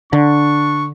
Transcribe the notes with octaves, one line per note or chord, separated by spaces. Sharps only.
D3 D4 C#6